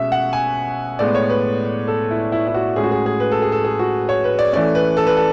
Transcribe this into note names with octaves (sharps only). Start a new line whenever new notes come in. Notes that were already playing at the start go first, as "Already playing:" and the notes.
Already playing: B2 G#3 C#4 E5
F#5
G#5
A2 G#3 B3 D5
C#5
B4
A4
E4
E4
E4
F#4
A2 G#3 C#4 G#4
F#4
G#4
G#4
B4
A4
G#4
A4
G#4
F#4
C#5
B4
D5
E3 A3 C#4 D5
B4
A4
B4
A4